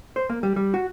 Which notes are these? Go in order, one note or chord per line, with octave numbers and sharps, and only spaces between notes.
C5
A#3
G3
G3
F#4